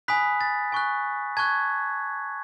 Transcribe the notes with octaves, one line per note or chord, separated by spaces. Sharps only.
G#5 B5 D#6 F#6 B6
A6
G#5 C#6 F#6
A5 C#6 F#6 G#6